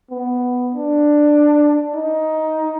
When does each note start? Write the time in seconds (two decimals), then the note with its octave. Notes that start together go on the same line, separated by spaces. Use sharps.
0.11 B3
0.75 D4
1.95 D#4